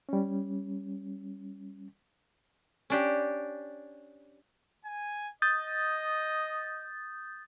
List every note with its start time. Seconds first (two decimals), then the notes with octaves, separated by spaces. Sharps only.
0.09 G3 C#4
2.90 C#4 D4 G4
4.85 G#5
5.42 D#5 D#6 G6 A6